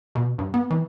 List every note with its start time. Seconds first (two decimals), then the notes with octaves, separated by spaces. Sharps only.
0.15 B2
0.38 G2
0.54 B3
0.70 E3